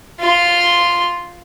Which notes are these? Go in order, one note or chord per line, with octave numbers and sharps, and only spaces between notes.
F4 C6